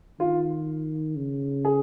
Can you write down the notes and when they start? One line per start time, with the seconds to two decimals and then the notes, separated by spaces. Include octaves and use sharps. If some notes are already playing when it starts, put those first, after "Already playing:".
0.20 D#3 F4
1.16 C#3
1.65 G#4